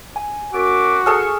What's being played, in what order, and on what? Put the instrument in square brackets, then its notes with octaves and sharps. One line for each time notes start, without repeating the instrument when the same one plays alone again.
[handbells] G#5
[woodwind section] F#2 E5 D6 [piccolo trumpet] F#4
[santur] G#4 A4 G#5 [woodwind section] C#6 [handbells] D#6 F6